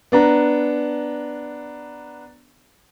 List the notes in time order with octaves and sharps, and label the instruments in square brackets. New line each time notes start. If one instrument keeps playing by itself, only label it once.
[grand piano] B3 D4 A#5